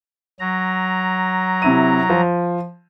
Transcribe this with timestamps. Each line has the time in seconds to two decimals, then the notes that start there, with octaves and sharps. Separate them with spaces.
0.40 F#3 A#5
1.62 C3 E4 D#7
2.10 F3